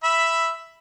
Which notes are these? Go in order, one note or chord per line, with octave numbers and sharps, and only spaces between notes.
E5 B5